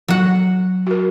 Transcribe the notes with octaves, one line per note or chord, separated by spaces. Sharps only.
F#3 F#5
F#4 A#4